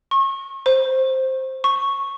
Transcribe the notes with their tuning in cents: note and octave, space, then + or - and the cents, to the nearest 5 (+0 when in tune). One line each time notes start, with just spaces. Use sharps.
C#6 -35
C5 +5
C#6 -5